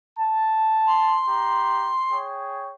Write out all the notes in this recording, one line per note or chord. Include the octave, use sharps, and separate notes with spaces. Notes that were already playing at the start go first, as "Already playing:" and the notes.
A5
C6
G4 A#5
G#4 C#5 G5